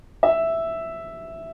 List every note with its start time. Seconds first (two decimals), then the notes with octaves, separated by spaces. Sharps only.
0.23 E5